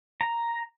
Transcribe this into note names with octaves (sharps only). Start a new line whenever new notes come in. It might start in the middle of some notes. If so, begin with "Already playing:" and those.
A#5